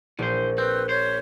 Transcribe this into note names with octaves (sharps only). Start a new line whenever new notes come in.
A#1 E3 C5
C4 B4 G6
C5 C#5